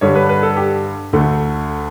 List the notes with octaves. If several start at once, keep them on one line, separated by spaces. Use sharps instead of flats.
G2 D3 G3 C#5
B4
B4
A4
G4
D2 D3 A3